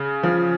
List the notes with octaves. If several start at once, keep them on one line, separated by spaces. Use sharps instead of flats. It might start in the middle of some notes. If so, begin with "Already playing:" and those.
Already playing: C#3
F3